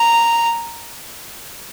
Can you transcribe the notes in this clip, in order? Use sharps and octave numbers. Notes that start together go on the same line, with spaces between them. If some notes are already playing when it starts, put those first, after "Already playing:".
Already playing: A#5